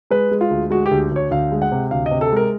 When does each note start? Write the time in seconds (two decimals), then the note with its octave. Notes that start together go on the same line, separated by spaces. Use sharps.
0.11 G#3 B4
0.31 G#3
0.41 F4
0.51 D2
0.70 G#3 F#4
0.86 G4
0.91 D2
1.11 D2 C#5
1.31 D2 F5
1.52 G#3
1.62 F#5
1.72 C3
1.91 D2 F5
2.06 D#5
2.11 C3
2.21 A4
2.32 G#3 A#4